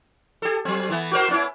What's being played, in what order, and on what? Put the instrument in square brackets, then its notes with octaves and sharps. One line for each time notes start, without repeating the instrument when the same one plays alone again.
[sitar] G4 A4
F#3 C4
E3 B3
F#4 A#4 C5
B3 C#4 E4